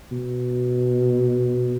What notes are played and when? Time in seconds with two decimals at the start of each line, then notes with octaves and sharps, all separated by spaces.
0.12 B2